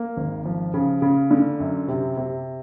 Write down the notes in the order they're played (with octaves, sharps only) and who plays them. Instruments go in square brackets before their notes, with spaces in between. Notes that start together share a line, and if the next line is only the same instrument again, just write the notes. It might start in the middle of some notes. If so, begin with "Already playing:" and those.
Already playing: [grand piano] A#3
G#1
F3
C#3
C#3
D3
F#2
C3
C3